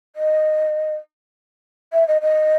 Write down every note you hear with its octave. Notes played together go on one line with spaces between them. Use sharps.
D#5
E5
D#5
D#5